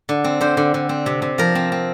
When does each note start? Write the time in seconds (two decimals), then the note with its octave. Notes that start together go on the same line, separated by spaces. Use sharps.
0.09 D3
0.24 C4
0.41 D3 C5
0.57 D3
0.74 D3
0.89 C4
1.06 C3
1.22 C3
1.38 F3 A#4
1.55 C4
1.72 C4